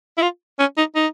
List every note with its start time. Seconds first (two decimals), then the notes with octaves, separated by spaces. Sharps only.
0.18 E4
0.22 F4
0.59 C#4
0.77 D#4
0.95 D#4